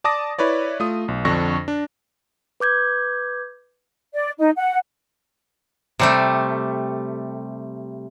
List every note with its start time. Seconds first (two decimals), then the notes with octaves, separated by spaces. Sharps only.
0.04 D5 A5 D6 D#6 A#6
0.39 E4 B4 C#5 D5
0.80 A3 F4 D#6
1.08 B1
1.25 F2 D3 D4 C#6 A#6
1.68 D4
2.60 B4 D6 G6 G#6
4.14 D5
4.38 D#4
4.56 F#5
5.99 C3 G3 A3